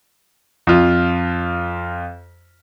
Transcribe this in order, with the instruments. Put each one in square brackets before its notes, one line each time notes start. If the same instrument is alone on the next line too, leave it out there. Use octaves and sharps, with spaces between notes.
[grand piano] F2 F4